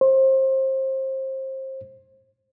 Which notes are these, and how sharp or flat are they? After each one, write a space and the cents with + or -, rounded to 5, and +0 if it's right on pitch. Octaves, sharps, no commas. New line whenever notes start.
C5 +25